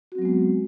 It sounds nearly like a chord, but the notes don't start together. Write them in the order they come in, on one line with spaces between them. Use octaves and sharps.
F#4 C4 F#3 B3 G#3